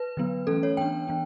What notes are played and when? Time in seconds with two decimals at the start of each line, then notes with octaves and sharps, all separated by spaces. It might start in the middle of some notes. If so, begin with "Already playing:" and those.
Already playing: B4
0.17 D3 F#3 B3
0.47 E3 A3 C#4 A4
0.63 C#5
0.77 E3 B3 D4 G5
1.08 E3 B3 D4